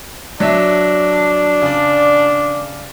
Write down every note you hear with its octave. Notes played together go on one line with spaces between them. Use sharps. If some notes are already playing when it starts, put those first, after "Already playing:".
F#3 D4 E5
C#3 D5